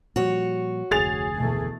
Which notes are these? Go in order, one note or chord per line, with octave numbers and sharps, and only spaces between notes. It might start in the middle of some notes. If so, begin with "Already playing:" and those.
A#2 F3 G3 F#4 C#5
F1 D2 G#4 A6 F7
B2 E3 A3